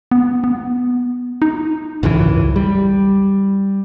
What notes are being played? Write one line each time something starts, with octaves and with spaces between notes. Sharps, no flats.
B3
B3
D#4
G#1 C#2 F#2 E3
G3